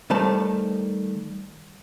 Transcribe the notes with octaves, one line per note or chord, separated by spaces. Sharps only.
D#3 G3 A3 C5 A5